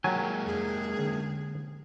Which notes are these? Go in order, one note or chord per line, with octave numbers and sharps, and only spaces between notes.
F#3 G#3 A#3 G4 G#5
F2 G#4
D3 C#4